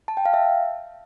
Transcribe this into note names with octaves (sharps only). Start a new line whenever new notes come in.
A5
G5
F5
E5